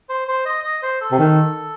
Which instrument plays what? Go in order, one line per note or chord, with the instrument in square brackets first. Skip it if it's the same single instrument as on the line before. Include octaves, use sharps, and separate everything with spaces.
[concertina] C5
C5
D#5
D#5
C5
A4
[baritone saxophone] C3
D#3